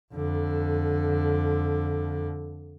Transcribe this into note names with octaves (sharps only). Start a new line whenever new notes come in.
F2 D3